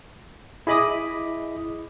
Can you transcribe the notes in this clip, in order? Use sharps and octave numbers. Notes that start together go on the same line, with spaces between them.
E4 G#4 D#5 B5 D6 D#6